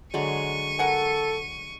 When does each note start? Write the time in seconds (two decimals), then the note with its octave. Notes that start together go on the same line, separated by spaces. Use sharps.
0.14 D3 F#3 G#3 C#6 D#7
0.79 A4 A#4 F#5 G#5